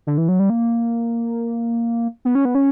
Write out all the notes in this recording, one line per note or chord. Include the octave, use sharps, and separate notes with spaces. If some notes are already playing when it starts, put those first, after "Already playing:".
D3
E3
F#3
G3
A#3
B3
C#4
B3
C#4